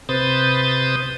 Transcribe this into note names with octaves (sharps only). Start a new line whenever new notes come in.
C3 B4 C5 D#6 G6 A6